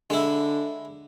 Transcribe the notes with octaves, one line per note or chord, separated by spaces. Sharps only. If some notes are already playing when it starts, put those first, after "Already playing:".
D3 G#3 E4